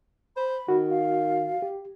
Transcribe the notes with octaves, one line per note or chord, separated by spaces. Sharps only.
C5 B5
D#3 F#4
F5
G4